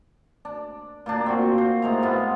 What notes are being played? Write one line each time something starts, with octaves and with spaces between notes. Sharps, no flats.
D4
A#2 A#3 D4
C4 F#4
C5
A2 G#3 A#5
G#2 B3 F4